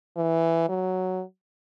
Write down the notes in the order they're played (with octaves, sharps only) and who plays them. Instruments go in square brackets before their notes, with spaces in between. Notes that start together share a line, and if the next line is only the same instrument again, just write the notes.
[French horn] E3
F#3